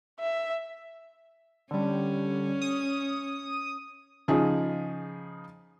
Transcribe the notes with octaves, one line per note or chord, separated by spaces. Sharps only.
E5
D3 G3 C#4
D#6
C#3 F3 D#4 G#4